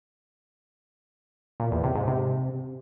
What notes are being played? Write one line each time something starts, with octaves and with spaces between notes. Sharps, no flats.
A#2
E2
C3
G#2
C3